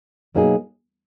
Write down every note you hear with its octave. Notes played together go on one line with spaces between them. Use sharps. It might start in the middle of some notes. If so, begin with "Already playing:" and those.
B2 F#3 A#3 D#4 G#4